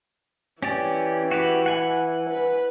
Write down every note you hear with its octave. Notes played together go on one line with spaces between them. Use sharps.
E3 C#4 G4 D5
F#4 G4 B4
F#5 G#5 B5
B4